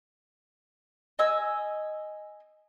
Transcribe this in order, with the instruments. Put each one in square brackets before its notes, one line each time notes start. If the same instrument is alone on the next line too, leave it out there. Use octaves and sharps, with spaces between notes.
[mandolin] D#5 G#5 E6